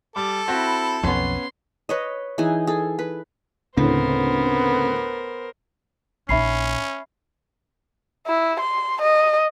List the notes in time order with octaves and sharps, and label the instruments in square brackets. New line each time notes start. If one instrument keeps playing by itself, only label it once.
[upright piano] G3 [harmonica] A4 [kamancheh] D6
[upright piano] C4 F#4 [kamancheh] E4 B5
[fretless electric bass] B1 F2 [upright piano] B3 C#4 [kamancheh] C6
[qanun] B4 C#5 D#5
E3 D#4 G#4
G#4 A4
B4
[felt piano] D2 A2 [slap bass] C#3 C4 [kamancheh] B3 [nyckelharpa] A#4 C5
[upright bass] A#1 D#4 [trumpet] C#4 [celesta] E5 B5 C7
[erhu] E4
C6
D#5